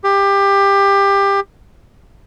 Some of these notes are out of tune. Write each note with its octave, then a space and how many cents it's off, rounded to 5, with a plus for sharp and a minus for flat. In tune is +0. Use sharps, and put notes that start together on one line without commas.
G4 +20